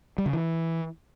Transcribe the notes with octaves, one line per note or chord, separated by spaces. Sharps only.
G3
C#3
E3